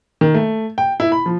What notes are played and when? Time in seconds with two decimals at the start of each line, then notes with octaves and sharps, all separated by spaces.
0.21 D#3
0.34 A3
0.78 G5
1.00 E4
1.12 B5
1.26 F3